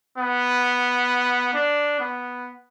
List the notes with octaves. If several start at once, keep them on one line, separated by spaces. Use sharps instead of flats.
B3
D4
B3